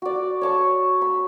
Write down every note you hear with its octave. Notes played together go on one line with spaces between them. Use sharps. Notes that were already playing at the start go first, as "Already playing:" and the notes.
F#4 D5
C#5 A5 C#6
B5